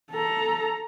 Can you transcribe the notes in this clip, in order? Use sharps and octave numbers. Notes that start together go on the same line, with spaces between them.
A4 A#5